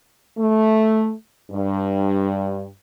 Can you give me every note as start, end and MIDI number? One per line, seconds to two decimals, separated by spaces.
0.37 1.10 57
1.51 2.67 43